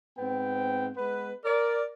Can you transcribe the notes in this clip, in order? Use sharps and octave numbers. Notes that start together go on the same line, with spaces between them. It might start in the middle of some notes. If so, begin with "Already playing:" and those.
G#2 B3 C4 G5
G#3 B3 B4
A#4 D5